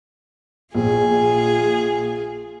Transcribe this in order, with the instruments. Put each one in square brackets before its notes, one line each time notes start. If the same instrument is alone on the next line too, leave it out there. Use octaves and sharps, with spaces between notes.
[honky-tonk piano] A#1 [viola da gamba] F4 G#4